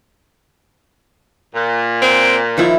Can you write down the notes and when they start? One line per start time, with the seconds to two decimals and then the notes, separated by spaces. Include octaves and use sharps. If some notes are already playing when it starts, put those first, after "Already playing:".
1.54 A#2
2.02 C4
2.58 D#3 F3 E4